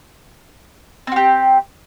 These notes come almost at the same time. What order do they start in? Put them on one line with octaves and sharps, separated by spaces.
C4 F#4 G4